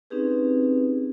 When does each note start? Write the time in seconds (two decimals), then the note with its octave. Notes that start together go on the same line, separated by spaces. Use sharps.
0.10 C4 C#4 D#4 G4 G#4 B4